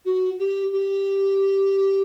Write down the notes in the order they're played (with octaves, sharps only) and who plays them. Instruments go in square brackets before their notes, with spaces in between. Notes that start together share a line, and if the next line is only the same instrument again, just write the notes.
[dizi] F#4
G4
G4